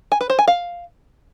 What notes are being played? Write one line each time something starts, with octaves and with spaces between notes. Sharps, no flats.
G#5
B4
C5
G#5
F5